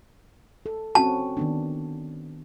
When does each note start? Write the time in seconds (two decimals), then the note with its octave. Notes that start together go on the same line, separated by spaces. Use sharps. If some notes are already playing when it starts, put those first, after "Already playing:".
0.66 A4
0.95 C4 C#4 F#4 A5
1.37 D#3 B3 D4